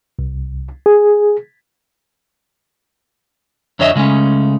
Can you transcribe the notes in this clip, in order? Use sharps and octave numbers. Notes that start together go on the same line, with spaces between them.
C2
G#4
F2 D3 C#5 D#5 E5
C#3 G#3 A3 C#4